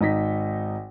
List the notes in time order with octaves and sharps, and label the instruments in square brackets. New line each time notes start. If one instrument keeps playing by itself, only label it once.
[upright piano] G#1 D#4 A#6 B6